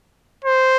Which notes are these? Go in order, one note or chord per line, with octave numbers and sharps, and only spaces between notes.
C5